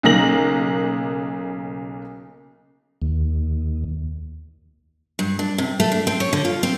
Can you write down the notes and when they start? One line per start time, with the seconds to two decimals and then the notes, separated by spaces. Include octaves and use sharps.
0.03 B1 C#3 A#3 A#6 F#7
3.02 D#2
5.19 G2
5.39 D4
5.58 C3
5.80 A3
5.92 D4
6.07 C4
6.20 C#5
6.33 D3
6.45 F4
6.63 C4